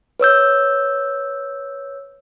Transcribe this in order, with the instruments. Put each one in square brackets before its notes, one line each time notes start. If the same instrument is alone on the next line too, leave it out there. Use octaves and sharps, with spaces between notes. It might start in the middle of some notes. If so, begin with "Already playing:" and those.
[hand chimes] B4 C#5 E6 G6